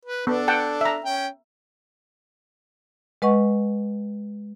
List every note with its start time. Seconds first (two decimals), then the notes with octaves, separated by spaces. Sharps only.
0.05 B4
0.27 B3 D4 A4
0.48 F#5 G5 A5
0.81 E5 A#5
1.05 C#4 G5
3.22 G#3 B4 D#5 F#5 C#6